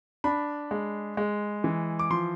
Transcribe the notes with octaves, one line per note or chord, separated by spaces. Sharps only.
D4 B5
G#3
G#3
E3
D6
F3 C6